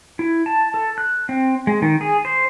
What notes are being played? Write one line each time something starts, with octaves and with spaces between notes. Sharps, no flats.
E4
A5
A4
F#6
C4
G#3
D#3
G#4
C5